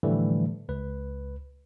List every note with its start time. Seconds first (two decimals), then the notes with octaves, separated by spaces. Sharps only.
0.03 A2 D3 E3 F3 G3 A3
0.69 C#2 B4